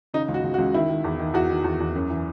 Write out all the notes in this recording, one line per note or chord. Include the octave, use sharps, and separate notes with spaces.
C#3 D#4
C#2
F#4
C#2
F#4
C#2
D#3 E4
D#3
E2
D#3
E2 F#4
D#3
E2
E2
F#2
E3